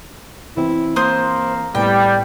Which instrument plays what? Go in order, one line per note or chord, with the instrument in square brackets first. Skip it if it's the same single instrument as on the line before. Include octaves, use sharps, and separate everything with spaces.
[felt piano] E3 C4 [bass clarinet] E4
[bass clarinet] A#3 [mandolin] C5 D#6
[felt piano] A2 B3 [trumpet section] G3 [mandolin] G5